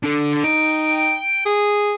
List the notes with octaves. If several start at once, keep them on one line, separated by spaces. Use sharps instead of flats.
D4 A4
D#4 G5
G#4